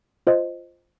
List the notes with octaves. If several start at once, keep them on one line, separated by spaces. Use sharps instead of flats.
F4 C5 D#5